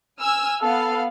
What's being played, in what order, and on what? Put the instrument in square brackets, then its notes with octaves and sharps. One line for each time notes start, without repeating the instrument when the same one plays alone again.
[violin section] G#5 E6 F6
[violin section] B3 F5 [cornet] A4